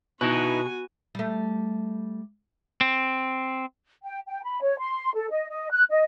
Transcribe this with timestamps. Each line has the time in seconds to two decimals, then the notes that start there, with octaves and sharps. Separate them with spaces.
0.21 B2 D#4 E4 F#4 B4 G#5
1.15 G3 A3
2.81 C4
4.04 G5
4.27 G5
4.43 B5
4.62 C#5
4.78 C6
5.14 A4
5.30 D#5
5.49 D#5
5.71 F#6
5.89 D#5